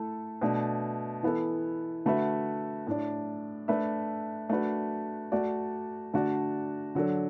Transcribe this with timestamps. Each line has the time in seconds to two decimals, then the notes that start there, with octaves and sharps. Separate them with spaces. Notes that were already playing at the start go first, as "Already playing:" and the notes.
Already playing: A3 E4 A4
0.41 B2 A3 D4
1.23 E3 B3 E4 A4
2.06 D3 A3 F#4 B4 E5
2.87 A2 A3 D4
3.68 A3 D4 B4 E5
4.50 A3 D4 F#4 B4
5.32 A3 F#4 D5
6.14 D3 A3 D4 F#4 D5
6.95 D3 F#3 D4 A4